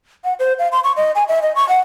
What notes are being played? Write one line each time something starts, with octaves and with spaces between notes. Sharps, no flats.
F#5
C5
F5
C6
C#6
D#5
G#5
E5
D#5
C#6
F#5